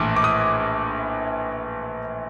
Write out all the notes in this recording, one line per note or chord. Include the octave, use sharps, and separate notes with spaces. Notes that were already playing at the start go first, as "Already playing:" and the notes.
Already playing: A#1 A2 E3 D6
D6
D#6